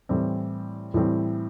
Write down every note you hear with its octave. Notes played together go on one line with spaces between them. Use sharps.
A2 E3 G3 C4
A2 E3 G3 C4